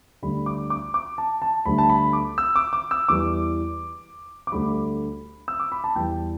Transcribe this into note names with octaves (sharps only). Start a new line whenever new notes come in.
D2 D3 G3 B5
D6
D6
D6
A5
A5
D2 D3 G3 B5
A5
B5
D6
E6
D6
D6
E6
E2 E3 G3 D6
D6
D2 D3 G3 B5
E6
D6
B5
A5
E2 E3 G3 G5